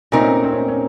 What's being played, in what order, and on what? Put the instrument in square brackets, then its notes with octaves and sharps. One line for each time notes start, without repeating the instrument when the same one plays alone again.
[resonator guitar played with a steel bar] A#2 A3 D#4 A#4 [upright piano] C4
[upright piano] C#4
C4
C#4
C4
C#4
C4
C#4